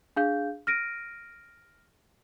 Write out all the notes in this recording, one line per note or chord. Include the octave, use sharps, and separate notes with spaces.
D4 G#4 F5 G6
F6 A#6 D7 D#7